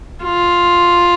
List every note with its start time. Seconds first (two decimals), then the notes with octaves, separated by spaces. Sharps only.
0.24 F4